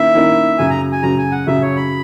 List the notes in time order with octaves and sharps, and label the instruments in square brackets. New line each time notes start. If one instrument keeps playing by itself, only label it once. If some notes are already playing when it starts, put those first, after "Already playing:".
Already playing: [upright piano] D#3 A#3 C#4 E4 [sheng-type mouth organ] E5
[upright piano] D#3 A#3 C#4 E4
[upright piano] F#2 C#3 F#3 [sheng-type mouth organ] G#5
[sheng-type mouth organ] A#5
G#5
[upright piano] F#2 C#3 F#3 [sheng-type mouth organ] A#5
[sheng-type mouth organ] G#5
F#5
[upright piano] F#2 C#3 F#3 [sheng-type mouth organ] E5
[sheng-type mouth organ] C#5
B5